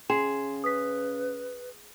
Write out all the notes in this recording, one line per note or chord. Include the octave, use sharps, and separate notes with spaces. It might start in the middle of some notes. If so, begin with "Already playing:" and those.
C#3 G#4 G5 C6 E7
B4 D#6 B6